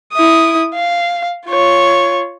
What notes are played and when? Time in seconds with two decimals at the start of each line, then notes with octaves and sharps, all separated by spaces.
0.13 E4 D#6
0.74 F5
1.48 F4 C#5